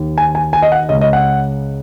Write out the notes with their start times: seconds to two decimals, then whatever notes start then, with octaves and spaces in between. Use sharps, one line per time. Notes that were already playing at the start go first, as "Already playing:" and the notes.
Already playing: D#2 D#3
0.18 G#5
0.35 G#5
0.53 G#5
0.62 D#5
0.72 F#5
0.89 C#2 C#3 D#5
1.01 D#5
1.13 F#5